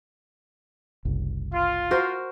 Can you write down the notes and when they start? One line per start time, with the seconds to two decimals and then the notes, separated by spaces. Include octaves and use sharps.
1.05 F#1 C2
1.52 F4
1.91 F#4 A#4 C5